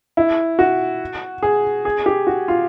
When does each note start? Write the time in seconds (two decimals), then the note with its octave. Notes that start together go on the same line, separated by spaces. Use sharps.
0.17 E4
0.59 F#4
1.43 G#4
1.85 G#4
2.06 G4
2.27 F#4
2.48 F4